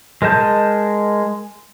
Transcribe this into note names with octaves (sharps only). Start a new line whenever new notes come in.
G#3 A#4 D#5 A5 G6